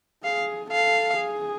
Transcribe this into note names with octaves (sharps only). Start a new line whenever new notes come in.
G#4 F5
A4 F5
G#4